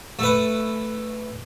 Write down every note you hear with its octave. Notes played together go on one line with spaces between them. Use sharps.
A3 B4